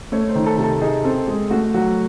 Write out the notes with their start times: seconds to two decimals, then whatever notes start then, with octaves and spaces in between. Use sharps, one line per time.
0.12 A3 C#5
0.29 C5
0.35 D#3
0.46 A4
0.58 C3
0.64 A4
0.82 D#4 G#4
1.04 C4 A4
1.27 G#3 G#4
1.50 A3 F#4
1.74 F#3 F#4